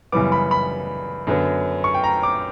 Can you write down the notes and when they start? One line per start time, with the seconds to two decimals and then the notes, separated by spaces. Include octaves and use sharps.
0.12 F#2 C#3 E3 G3 B3 D6
0.32 B5
0.51 B5
1.27 F#2 D3 F#3 B3
1.84 C#6
1.94 G5
2.04 A#5
2.23 D6